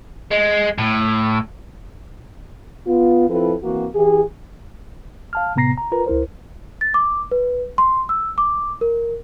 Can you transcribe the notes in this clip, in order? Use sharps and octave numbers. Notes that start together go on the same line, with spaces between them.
G#3
A2
B3 F4
F3 C4 E4 F4 A4 B4
E3 A#3 C4 F#4
E3 G4 G#4
F5 A5 F6
A2 C3 B3 A#5 A#6 C7
A#5
F4 A#4 B4 A#5
C#2 E4 A#4 C5
A6
D6
B4
C6
E6
D6
A#4